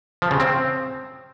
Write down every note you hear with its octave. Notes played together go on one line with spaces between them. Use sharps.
F3
C#3
C4